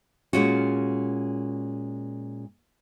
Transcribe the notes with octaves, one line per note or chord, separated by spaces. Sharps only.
A#2 G#3 C#4 F4 F#4